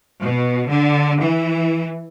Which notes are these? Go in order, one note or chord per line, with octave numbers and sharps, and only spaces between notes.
B2
D3
E3